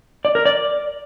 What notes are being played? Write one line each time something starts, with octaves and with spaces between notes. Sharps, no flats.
D5
A#4
D5